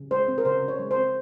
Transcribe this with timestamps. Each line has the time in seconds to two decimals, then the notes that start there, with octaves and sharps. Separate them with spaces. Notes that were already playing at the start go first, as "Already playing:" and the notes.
Already playing: C#3
0.11 G#3 C5
0.28 C4
0.38 A#4
0.45 C#3 C5
0.62 C#3
0.68 C#5
0.79 G#3
0.91 C5
0.97 C4